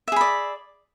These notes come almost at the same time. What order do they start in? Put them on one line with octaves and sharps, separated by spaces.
E5 G#4 B5 D5